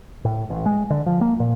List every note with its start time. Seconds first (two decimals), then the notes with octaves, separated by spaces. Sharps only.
0.25 A2
0.50 A1
0.66 G#3
0.90 D3
1.06 F3
1.21 A#3
1.40 A#2